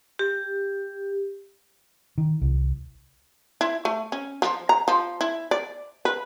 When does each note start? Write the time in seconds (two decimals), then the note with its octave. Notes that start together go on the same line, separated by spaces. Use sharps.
0.19 G4
2.18 D#3
2.42 C2
3.61 E4
3.85 A3
4.12 C#4
4.42 F3
4.69 A#5
4.88 F3
5.21 E4
5.51 D5
6.05 B4